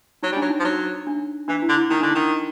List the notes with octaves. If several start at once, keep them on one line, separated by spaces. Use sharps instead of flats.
F#3 D#4
G3 D4
F#3
D#4
F3
F#3 D#4
D4
E3 D4
E4
D3
E4
D#3 D#4
D3 D4
D#3 D#4